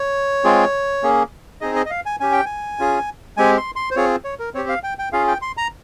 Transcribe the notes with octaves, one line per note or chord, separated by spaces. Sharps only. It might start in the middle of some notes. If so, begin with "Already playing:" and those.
Already playing: C#5
G#3 C4 F4 G#4
A#3 C#4 G#4
C4 D#4 G#4 D#5
D#5
D#5
F5
G#5
C#4 G4 G#5
G5
G#5
C#4 F4 G#4
G#3 C4 G4 G#5
C6
C6
C5
C4 F4 G#4 C#5
C#5
A#4
C4 G4 C#5
F5
G5
G5
C#4 F4 G#4 F5
G5
C6
A#5